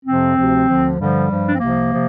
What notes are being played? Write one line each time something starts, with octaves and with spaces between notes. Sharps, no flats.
F2 C3 F3 C4
D2 C3 F3
D2 D3 F3
G2 D3 F3 G3
G2 F3
D4
C4
C2 C3 F3 A#3
C3 F3